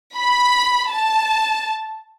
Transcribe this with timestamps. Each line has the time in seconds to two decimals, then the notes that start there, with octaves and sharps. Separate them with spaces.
0.16 B5
0.92 A5